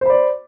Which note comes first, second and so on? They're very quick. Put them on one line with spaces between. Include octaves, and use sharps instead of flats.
C5 B5 D5